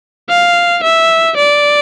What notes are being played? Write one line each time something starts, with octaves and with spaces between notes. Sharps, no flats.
F5
E5
D5